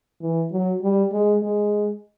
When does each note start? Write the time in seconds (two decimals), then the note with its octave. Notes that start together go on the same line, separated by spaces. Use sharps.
0.21 E3
0.52 F#3
0.82 G3
1.12 G#3
1.42 G#3